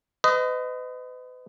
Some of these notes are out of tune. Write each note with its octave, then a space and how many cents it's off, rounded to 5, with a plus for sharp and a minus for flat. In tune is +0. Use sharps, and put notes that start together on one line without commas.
B4 +40 D#5 +0